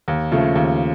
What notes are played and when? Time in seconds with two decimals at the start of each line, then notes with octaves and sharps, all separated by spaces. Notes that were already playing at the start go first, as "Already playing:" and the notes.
0.08 D#2
0.32 C#3 F3 A3
0.55 D#2